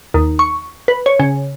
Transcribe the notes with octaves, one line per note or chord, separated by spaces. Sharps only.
D#2
C#6
B4
C#5
C#3